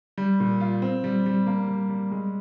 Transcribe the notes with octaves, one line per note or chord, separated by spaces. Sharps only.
G3
A#2
F4
C4
G3
G3
A#3
G3
G3
G#3